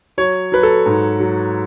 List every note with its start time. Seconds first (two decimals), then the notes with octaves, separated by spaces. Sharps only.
0.18 F#3 C#5
0.52 F#3 B4
0.63 A4
0.86 G#2
1.20 F#3